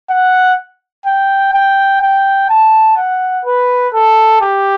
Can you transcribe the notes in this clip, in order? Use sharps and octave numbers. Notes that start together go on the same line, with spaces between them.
F#5
G5
G5
G5
A5
F#5
B4
A4
G4